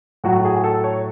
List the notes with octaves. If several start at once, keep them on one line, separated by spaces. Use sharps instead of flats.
A2 F#3 F#4
G#4
A4
C#5